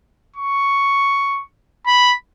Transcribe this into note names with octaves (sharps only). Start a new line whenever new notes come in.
C#6
B5